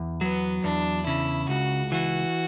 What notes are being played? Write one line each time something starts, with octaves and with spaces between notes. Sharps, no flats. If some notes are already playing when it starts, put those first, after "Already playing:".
Already playing: E2
F#3 B3
E2 D4
C#3 E4
C#2 F#4
E3 F#4